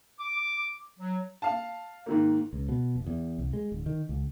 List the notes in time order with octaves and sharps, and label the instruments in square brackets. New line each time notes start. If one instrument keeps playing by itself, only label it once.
[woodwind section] D6
F#3
[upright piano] F5 A5
G#2 D#3 A#3
[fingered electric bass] C#2
B2
F1
E2
C2
G#3
D1
D#3
C#2